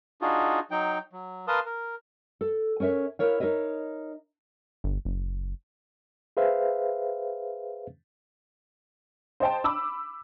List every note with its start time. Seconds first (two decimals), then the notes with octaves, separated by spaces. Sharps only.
0.22 D4 D#4 F4 F#4 G#4
0.71 F#3 D#4 G5
1.13 F#3
1.48 A#4 B4 F5 A5 C6 D#6
1.66 A#4
2.41 A4
2.80 C#4 A#4 C#5 E5
3.19 E4 A#4 C#5 F5
3.40 D#4 A#4 C#5 D#5 E5
4.84 G1
5.05 F#1
6.37 G#4 B4 C5 E5 F5
9.40 C5 D#5 G5 A5
9.64 B5 D6 E6